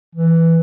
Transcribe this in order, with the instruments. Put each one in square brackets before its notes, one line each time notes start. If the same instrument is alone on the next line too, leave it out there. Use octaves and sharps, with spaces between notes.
[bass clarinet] E3